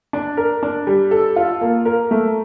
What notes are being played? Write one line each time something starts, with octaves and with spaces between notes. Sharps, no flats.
D4
A#4
D4
G3
A4
F4
A#3
A#4
A3